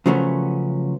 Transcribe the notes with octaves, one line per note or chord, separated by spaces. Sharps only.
C#3 F3 F#3 A3 B3 C#4